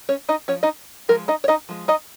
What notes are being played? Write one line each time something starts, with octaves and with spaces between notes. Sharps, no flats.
C#4 C#5
D#4 D#5
F3 C#4 C#5
D#4 D#5
F3 G#3 A#4
D#4 D#5
C#5
D#4 D#5
F3 G#3
D#4 D#5